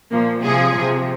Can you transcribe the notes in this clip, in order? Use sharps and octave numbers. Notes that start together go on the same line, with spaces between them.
A#2 F3 A#3
C3 F3 G#4
C3 F3